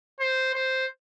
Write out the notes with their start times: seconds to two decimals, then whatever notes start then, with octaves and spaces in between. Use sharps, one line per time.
0.20 C5
0.54 C5